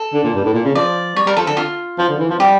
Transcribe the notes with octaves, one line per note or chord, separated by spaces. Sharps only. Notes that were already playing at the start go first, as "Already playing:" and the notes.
Already playing: A4
D3
A#2
G2
A2
A#2
C#3
F3 D5
G3 C#5
G3 A#4
F3 A4
D3 A4
F4
F3
D3
E3
F3
G3 G4